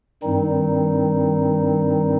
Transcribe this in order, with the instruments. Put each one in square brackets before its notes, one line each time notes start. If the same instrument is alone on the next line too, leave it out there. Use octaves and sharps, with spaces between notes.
[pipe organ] G2 D#3 G3 C4 D#4